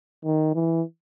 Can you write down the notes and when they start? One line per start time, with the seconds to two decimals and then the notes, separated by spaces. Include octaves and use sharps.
0.24 D#3
0.55 E3